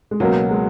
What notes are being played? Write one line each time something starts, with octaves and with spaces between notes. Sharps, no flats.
G#3
C#2 B2 F#3 A#3
G#3